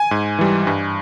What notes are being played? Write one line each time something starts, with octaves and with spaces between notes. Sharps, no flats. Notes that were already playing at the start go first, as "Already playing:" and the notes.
Already playing: G#5
G#2
E3 G3
G2